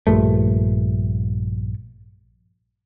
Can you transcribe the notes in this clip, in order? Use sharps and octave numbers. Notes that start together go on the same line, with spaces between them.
A#1 G2 A3